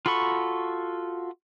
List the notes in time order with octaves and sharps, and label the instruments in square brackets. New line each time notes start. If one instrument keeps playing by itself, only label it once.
[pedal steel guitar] F4 F#4 A4 B5 C#6